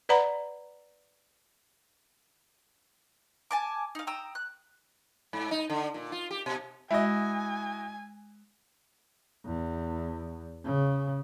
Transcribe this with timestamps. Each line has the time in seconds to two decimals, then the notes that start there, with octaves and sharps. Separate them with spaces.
0.09 B4 D5 F#5 A#5 B5
3.51 G#5 A5 D6
3.95 D#4 F5
4.07 G5 A#5 D#6 E6
4.35 F#6
5.33 G#2
5.51 D#4
5.70 D3
5.94 A#2
6.12 F4
6.31 G4
6.46 B2
6.91 G#3 E4 F#4 D#5 E5 G#5
9.45 E2
10.64 C#3